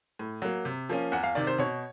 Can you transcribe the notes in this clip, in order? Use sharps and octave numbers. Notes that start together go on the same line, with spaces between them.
A2
F#3 A#3
C3
F3 A#3 C#4
E2 F#5
F5
C3 D#3 D5
C5
B2 C#5